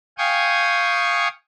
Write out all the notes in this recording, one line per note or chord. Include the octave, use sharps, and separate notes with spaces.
F5 G5 G#5 C#6 D#6